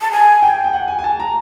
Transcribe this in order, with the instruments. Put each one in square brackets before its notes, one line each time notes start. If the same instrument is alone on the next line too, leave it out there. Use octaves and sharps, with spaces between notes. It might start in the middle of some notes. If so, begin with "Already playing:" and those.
[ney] A5
G#5
[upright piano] G5
G5
F#5
G#5
G#5
A5
A#5